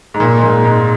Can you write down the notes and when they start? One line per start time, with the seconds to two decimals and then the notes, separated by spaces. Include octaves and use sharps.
0.14 G#2
0.20 A#2
0.38 G#2
0.43 A#2
0.65 G#2